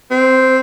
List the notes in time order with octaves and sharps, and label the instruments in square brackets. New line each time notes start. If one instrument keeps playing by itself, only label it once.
[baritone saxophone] C4